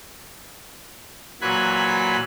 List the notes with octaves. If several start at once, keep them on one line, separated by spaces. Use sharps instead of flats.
A#2 E3 F#3 G#5 B5 F#6